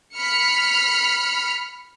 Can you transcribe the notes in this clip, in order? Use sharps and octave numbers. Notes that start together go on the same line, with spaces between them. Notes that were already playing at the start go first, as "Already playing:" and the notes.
B5 F6 C#7